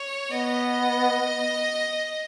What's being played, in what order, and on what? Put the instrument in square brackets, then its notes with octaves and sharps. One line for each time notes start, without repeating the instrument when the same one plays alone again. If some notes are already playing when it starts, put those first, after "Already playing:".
Already playing: [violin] C#5
[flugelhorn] B3 [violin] D#5